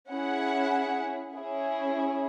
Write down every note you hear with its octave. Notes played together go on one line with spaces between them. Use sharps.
C#4 E4 G#4 F#5
C#4 E4 G#4